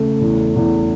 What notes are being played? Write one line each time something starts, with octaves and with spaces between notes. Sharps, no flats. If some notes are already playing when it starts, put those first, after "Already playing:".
Already playing: C#3 A3
E2
E2